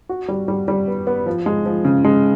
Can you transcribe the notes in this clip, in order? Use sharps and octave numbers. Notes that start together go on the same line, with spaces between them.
F#4
G3
G3
G3
B3
B3
F3
G#3
F3
C#3
G#3